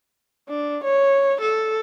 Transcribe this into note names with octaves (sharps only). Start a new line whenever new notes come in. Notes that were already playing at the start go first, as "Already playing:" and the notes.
D4
C#5
A4